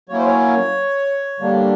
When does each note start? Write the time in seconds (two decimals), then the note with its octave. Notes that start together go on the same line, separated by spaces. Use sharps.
0.09 F#3 A#3 C#4 E4 C#5
0.18 C5
0.26 C#5
1.39 D3 G3 A#3 D4